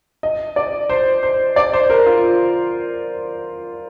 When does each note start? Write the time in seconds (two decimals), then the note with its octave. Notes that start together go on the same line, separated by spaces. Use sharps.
0.23 D#5
0.56 D5
0.89 C5
1.23 C5
1.56 D5
1.73 C5
1.90 A#4
2.06 F4